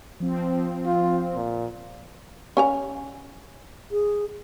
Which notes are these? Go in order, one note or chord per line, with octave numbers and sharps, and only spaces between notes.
F3 C4
F4
A#2
C#4 G#5 A#5
G#4